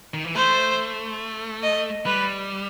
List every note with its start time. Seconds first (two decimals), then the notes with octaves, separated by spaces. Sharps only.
0.14 D#3
0.24 E3
0.35 A3 C5
1.63 D#5
2.06 G3 B4